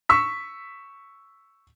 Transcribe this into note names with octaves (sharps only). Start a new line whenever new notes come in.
C#6 E6 B6